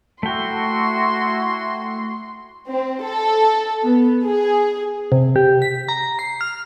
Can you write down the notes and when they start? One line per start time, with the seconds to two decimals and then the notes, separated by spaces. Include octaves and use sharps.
0.23 A3 E4 F#4 G5 C6
2.70 C4
3.02 A4
3.84 B3
4.24 G#4
5.12 C3
5.36 G4
5.62 B6
5.88 A#5
6.19 C7
6.41 F6